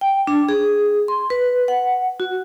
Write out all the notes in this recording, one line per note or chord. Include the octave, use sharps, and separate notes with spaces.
G5
D4
G#4
C6
B4
F#5
F#4